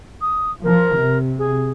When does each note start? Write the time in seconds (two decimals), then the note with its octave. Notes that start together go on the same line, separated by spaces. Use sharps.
0.21 D#6
0.64 F3 A#4
0.95 C3
1.38 G#4